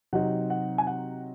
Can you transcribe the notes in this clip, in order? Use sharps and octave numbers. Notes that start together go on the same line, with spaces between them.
C3 F#3 C4 D#4 F#5
F#5
G#5
F#5